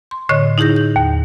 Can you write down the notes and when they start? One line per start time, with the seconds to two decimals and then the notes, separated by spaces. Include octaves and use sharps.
0.11 C6
0.29 A2 D3 C#5 D#5 F#6
0.58 D#4 E4 G#4 G6 A#6
0.76 G6
0.96 D#2